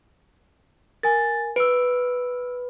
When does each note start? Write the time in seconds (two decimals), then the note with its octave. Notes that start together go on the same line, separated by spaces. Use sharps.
1.03 A#4 G#5 A6
1.56 B4 E6 D7